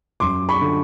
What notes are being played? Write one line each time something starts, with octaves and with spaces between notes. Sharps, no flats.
F#2 C6 D6
B5 C#6
D3